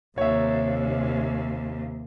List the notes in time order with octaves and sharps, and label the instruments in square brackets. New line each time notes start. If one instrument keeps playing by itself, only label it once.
[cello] D#2 [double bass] C3 [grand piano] C#5 E5